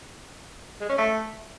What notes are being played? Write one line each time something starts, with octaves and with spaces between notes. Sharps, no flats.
G#3
C#4
A3